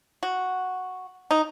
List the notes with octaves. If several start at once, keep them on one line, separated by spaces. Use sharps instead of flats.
F#4
D#4